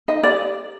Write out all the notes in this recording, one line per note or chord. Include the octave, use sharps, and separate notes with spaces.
D#4 D#5
G4 D5